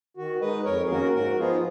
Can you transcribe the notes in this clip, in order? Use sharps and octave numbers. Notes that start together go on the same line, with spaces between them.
D#3 F#4
G#3 D#4 B4 D#5
F2 A#4 C#5
G#4
D#3 A#3 C#4 F#4 A#4
G#2 F#4 A#4
F3 B3 D#4 F4 G#4